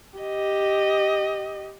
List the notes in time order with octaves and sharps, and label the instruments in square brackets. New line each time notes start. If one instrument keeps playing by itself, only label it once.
[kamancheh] G4 D#5